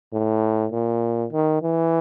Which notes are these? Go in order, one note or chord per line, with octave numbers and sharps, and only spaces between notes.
A2
A#2
D#3
E3